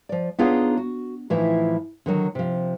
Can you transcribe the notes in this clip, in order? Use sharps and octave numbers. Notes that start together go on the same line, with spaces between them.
F3 D5
B3 D4 D#4 F4 G#4 C#5
F#4
A2 E3 F3 D#4 E4 E5
D3 D#3 F#3
C3 F3